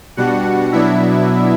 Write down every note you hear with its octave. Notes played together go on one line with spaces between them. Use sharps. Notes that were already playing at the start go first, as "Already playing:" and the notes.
B2 G3 D4 F#4 F#5
B2 F#3 B3 D4 E4 E5